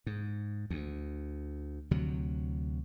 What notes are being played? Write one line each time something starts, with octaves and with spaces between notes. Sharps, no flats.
G#2
D2
D2 C3 F#3